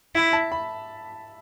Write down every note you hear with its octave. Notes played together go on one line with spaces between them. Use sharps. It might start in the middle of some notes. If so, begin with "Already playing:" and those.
E4 E5
A5
B5